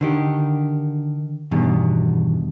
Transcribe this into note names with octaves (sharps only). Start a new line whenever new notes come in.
D3 D#3 G4
E2 G2 B2 D#3